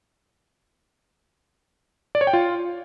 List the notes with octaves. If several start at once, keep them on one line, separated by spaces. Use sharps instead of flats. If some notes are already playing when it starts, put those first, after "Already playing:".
D5
C#5
G5
F4